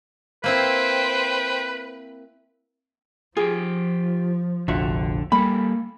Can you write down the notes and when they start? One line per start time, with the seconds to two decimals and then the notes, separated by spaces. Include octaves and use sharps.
0.44 A#3 C4 E4 B4 C5 G5
3.37 F3 F4 G4 G#4
4.68 F1 A#1 D3 F4 F#4 E5
5.32 G3 A#3 A4 B5